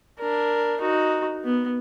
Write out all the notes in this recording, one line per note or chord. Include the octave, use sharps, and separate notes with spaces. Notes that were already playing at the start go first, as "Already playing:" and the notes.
D4 A#4
D#4 F#4
B3